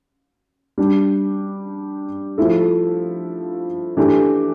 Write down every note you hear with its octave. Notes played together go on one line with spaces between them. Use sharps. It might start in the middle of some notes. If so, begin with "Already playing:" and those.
G3 D4 G4
F3 A3 E4 A4
E3 A3 D4 G4